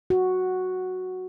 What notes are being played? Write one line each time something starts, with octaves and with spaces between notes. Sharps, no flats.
F#4